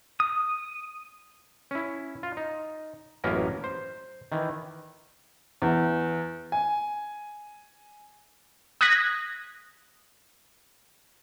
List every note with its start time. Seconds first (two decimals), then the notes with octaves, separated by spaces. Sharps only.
0.20 D#6
1.71 C#4 E4
2.23 F4
2.37 D#4
3.24 A1 F#2 A#3 B3 C#4 A#4
3.64 C5
4.32 D#3 E3
5.62 E2
6.52 G#5
8.81 D#6 F#6 G#6 A#6 B6